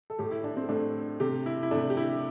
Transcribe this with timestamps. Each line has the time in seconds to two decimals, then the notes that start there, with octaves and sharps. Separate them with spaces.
0.10 A4
0.19 A2 A3 G4
0.31 E4
0.44 D4
0.57 C4
0.69 A2 A3 D4
1.20 C3 A3 G4
1.46 E4
1.63 E4
1.71 C3 A3 D4
1.90 G4
1.97 E4